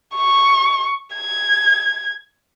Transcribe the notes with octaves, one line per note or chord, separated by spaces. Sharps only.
C#6
G#6